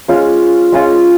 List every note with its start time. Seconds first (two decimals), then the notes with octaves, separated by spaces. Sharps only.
0.08 G#3 C#4 F4
0.72 G#3 C#4 F4